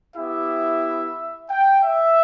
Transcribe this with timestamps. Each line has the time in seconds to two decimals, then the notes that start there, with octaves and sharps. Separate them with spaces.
0.16 B3 E4 G4 E5
1.49 G5
1.82 E5